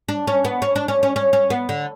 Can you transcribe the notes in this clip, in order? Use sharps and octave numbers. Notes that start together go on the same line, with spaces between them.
D4
C#4
B3
C#4
D4
C#4
C#4
C#4
C#4
B3
D3